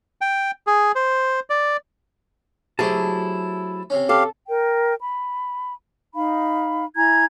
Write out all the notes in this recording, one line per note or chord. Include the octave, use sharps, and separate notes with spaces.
G5
G#4
C5
D5
F#3 A3 E4 G4 G#4 C5 A5
C3 C#4
G4 A4 F5
A#4 G5
B5
D#4 F5 B5
E4 G#5 A#5 G#6